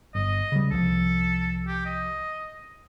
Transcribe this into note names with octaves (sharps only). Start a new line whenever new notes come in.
G1 D#5
C#3 G3
C2 F3 A4
G4
D#5